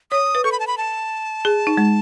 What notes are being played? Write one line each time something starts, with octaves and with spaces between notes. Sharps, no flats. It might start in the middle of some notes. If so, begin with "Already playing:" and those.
C#5 D#6
B4
A4 C#6
B5
A5
B5
A5
G#4
D#4
G#3